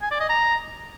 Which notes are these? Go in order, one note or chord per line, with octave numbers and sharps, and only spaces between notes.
G#5
D5
D#5
A#5